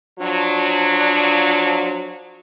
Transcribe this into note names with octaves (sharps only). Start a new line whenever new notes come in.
F3 F#3 D4